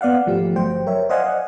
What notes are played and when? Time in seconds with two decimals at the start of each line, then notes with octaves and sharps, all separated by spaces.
0.01 B3 D5 F5 F#5
0.26 G#1 F3 A3 G4
0.56 G1 F#3 C5 G5
0.87 A#4 C#5 E5
1.09 C5 D5 D#5 F5 F#5 G#5
1.24 D#5 F#5